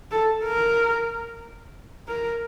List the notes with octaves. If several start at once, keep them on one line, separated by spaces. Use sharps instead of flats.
A4
A#4
A#4